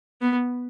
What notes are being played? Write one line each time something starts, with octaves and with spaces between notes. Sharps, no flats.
B3